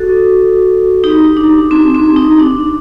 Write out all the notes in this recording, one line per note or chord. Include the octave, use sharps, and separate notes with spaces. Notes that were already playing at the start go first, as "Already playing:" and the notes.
Already playing: F#4 A4
D#4 G4
D4
C4
C4
D#4
D4